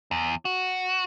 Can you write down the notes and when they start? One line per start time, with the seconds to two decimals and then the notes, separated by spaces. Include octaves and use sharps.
0.11 E2
0.45 F#4